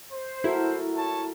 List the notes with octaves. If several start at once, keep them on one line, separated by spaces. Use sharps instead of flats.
C5
E4 F#4 A4 A#4
C#5 A5